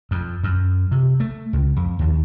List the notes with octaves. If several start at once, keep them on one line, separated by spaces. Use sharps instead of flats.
F2
F#2
C3
A3
C#2
F2
D#2